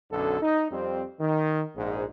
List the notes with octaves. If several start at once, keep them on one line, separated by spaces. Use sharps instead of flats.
B1 F#2 D3 A4
D#4
F2 G3 C4
D#3
A#1 G#2